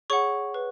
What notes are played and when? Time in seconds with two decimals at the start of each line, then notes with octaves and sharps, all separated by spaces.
0.10 G#4 C#5 F#5 C#6
0.54 B4